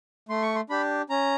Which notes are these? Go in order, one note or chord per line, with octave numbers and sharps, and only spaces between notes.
A3 C6
C#6
C6
D4 G4 B5
C#4 A#5